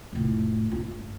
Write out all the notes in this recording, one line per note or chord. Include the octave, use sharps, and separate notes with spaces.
F1 A2
G2 F4